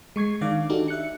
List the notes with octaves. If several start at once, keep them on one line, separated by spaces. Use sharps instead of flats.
G#3 C#6 G#6 C7
D#3 D4 F5 D6
D4 D#4 F#4 G4 A4
E5 F#6 C#7